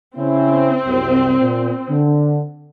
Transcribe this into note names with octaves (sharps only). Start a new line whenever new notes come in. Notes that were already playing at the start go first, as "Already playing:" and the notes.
C#3 C4 C#4 E4
C2 F#2
A#2
D3